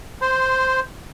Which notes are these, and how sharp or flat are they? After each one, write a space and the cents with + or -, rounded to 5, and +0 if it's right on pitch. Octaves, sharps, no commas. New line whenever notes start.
C5 +0 C6 -20